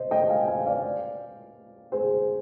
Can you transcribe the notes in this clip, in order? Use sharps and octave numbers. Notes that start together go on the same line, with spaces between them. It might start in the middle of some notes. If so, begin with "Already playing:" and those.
Already playing: C5 D#5
D#5 G5
F5 G#5
F5 G#5
D5 F5
G#4 C5